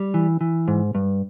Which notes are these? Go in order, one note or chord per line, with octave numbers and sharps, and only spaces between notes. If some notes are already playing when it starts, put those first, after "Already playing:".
Already playing: G3
E3
E3
G#2
G2